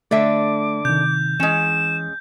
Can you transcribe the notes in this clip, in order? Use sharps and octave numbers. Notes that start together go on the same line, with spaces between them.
D3 A3 D4 E5 D6
C3 D#3 G6
E3 G#3 C#4 E7